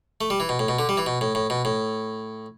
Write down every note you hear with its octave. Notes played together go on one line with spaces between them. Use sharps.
A3
G3
E3
B2
A2
B2
D3
G3
E3
B2
A2
A2
B2
A2